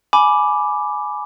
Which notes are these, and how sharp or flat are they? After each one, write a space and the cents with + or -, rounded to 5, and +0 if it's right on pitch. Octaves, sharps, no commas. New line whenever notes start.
G#5 +15 B5 +0 D6 +0